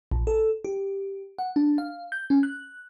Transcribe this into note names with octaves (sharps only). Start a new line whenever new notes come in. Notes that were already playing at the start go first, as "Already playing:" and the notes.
A#1
A4
G4
F#5
D4
F5
G6
C#4
F#6